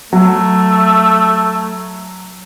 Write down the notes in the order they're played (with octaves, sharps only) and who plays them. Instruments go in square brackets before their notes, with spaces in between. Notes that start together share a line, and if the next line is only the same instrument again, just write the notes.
[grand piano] F#3 [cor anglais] A3